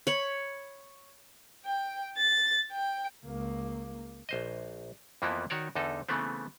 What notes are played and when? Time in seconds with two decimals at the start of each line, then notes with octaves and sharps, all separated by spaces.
0.07 C#5 B5
1.65 G5
2.17 A6
2.72 G5
3.26 C#2 A#3
4.29 A#1 C5 D#5
5.22 F2 E3 F3 A#3 B3 E4
5.50 D#3 F#4 C#5 D5
5.76 E2 D3 D#4 A4
6.09 C#3 E3 A3 B3 C4